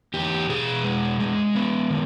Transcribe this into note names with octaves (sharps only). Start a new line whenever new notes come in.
E2 G4
B2 G#4
G#3
G#3
B3
D#3